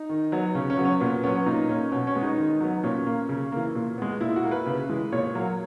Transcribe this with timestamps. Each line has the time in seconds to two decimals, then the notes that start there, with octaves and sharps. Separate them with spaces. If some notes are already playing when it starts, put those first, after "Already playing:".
Already playing: D#4
0.09 D#3
0.32 F#3 B3
0.55 C#3 C#4
0.70 C#4
0.77 F#3 B3
0.85 C#4
1.00 A#2 B3
1.23 F#3 B3 C#4
1.46 A#2 D#4
1.69 A#3 C#4
1.92 B2 C#4
2.07 C#4
2.15 G#3 B3
2.23 D#4
2.38 D#3
2.60 F#3 B3
2.83 A#2 C#4
3.07 A#3
3.29 C#3
3.52 E3 A#3
3.75 A#2
3.98 G#3 B3
4.21 A#2 E4
4.36 F#4
4.44 A#3
4.51 B4
4.67 C#3
4.89 E3 G#3
5.12 A#2 C#5
5.35 F#3 A#3